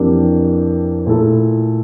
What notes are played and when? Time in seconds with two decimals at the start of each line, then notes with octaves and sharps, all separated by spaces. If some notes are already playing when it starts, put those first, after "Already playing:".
Already playing: F2 E3 A#3 D4 G4
1.06 A#2 A3 E4 A4